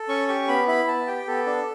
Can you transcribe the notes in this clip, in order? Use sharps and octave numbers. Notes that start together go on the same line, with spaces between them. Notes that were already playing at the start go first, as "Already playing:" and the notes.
Already playing: A4
C#4 C#6
G4 C#6
B3 B5
E4 B5
B3 A5
G4 G5
B3 A4
D4